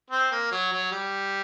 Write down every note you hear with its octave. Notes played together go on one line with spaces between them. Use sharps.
C4
A#3
F#3
F#3
G3